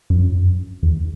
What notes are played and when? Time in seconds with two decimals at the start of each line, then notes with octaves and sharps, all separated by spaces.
0.10 F#2
0.83 E2